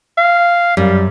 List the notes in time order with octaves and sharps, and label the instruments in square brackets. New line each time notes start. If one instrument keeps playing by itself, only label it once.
[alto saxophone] F5
[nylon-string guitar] F#2 [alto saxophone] G3